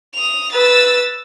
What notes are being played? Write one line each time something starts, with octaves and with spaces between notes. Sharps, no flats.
D#6 F7
B4 E6 A6